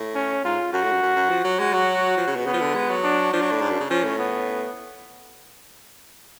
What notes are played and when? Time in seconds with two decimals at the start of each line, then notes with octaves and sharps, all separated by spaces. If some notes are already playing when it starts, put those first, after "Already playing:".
Already playing: A2
0.15 C#4
0.44 G#2 F4
0.73 F#2 F#4
0.83 A2
0.92 F#2
1.02 F#2
1.16 F#2
1.30 F3
1.44 F#3
1.59 G#3 F#4
1.73 F#3
2.17 F3
2.27 C#3
2.36 B2
2.46 C#3 B3
2.53 F3
2.61 D3
2.75 G#3
2.90 F#3
3.04 D4
3.32 F3 D4
3.41 F#3
3.51 A2
3.61 G#2
3.71 F#2
3.80 C#3
3.90 F3 C#4
4.04 A2
4.19 B3